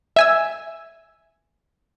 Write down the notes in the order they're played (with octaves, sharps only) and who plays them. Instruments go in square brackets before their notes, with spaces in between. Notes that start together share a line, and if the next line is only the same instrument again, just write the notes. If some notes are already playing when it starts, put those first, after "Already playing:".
[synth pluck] E5 G#5 E6